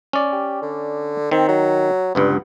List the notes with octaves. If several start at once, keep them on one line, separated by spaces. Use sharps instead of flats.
C#4 D5
G4
D3
D#3 C4
F#3
G1 C#2 G2 B3